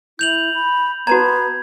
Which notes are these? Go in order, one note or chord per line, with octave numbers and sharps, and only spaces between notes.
E4 G6 F7 F#7
B5
B3 F#4 A5 A#5 G#6